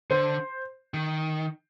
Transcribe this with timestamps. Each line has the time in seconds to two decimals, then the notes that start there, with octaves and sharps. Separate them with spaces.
0.10 D3 C5
0.94 D#3